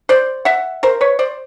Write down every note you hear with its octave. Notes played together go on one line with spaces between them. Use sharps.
C5 D5
E5 F#5
A#4 C5
B4 C#5
C5 D5